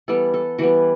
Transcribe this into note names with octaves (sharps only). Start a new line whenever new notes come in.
E3 G3 B3 A4
A4
E3 G3 B3 F#4